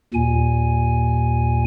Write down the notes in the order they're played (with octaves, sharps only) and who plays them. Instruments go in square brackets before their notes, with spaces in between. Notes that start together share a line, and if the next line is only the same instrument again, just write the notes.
[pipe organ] D#2 A#2 G#5